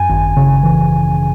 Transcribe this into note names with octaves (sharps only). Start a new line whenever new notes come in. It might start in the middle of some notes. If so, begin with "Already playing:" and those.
Already playing: F#2 G#5
G#1
C#3
E3